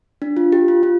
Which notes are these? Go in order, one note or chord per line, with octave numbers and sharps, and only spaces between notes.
D4
F4
G4
F4
F4